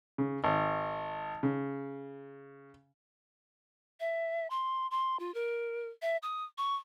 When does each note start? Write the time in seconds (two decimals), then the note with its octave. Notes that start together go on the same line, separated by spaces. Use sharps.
0.18 C#3
0.44 G#1
1.43 C#3
4.00 E5
4.50 C6
4.91 C6
5.20 F4
5.34 A#4
6.02 E5
6.23 D#6
6.58 C#6